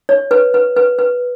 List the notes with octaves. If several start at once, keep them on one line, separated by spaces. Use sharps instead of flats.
C#5
B4
B4
B4
B4